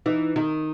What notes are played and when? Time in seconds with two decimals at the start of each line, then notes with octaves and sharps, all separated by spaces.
0.06 E3 D#4
0.36 D#3 D#4